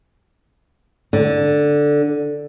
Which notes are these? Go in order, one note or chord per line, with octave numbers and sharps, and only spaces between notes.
D3